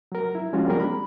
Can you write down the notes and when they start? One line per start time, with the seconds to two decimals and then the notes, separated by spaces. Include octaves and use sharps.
0.12 F#3 A#4
0.35 E4
0.53 F3 G#3 C#4 F4 F#4
0.66 G3 A#3 C4 D4 G#4 A#4
0.80 B5